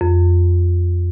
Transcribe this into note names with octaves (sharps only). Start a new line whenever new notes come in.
F2